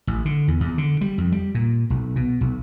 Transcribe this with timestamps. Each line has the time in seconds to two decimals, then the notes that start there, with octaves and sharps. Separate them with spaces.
0.07 A1
0.25 D3
0.48 E2
0.60 E2
0.78 D3
1.01 G3
1.18 F2
1.32 G3
1.55 A#2
1.90 B1
2.16 B2
2.41 B1